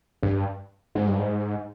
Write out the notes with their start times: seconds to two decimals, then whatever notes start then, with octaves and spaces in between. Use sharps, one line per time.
0.23 G2
0.95 G#2
1.07 G2
1.19 G#2